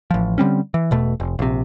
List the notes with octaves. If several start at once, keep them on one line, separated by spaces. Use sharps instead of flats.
A1 F3
D3 G3 C4 C#4
E3
E1 B2 A3
F1
A#1 C3